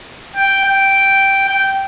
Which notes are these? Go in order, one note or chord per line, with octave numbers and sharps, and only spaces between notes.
G5
G5
G5